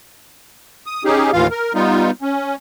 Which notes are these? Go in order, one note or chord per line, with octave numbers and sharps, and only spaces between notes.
D#6
C#4 D#4 G4 G#4
D#2 A2 E3 F4 F5
A#4
G3 B3 D#4 F4
C#4